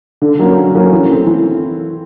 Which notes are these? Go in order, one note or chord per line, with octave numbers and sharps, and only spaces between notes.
D3
F#3 A#3 C#4
D3
F#3 A#3 C#4
E3
A3 C4
E3